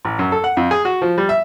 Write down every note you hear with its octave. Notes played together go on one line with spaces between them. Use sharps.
A1
F#2
A4
F#5
F2
G#4
F#4
F3
G3
E5